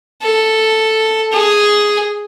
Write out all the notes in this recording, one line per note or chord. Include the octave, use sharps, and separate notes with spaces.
A4
G#4